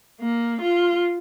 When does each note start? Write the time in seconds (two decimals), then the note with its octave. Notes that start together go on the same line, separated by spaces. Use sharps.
0.21 A#3
0.61 F4